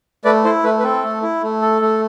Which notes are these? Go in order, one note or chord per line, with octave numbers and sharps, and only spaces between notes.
A3 B4 D5
E4 A4 C5
A3 B4
B4
C4 A4
A3
E4
A3
A4
A3